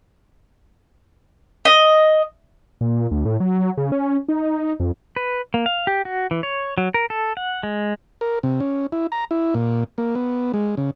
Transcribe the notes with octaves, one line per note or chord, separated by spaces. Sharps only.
D#5
A#2
D2
A2
F#3
F#3
C#3
C#4
D#4
F2
B4
A#3
F5
G4
F#4
E3
C#5
F#3
A#4
A4
F#5
G#3
A#4
C3
C#4
E4
A#5
E4
A#2
A#3
B3
G#3
C#3